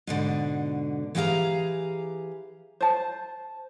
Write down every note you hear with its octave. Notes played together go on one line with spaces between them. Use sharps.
G#2 B2 D3
E3 G4 G#4 F5 A#5
C5 A5